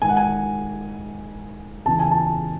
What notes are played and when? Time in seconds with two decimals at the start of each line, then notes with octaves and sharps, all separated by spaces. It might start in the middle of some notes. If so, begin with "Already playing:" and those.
0.02 G#2 D#3 G#5
0.09 F#5
0.17 G#5
1.85 E2 C#3 E3 A5
1.99 G#5
2.11 A5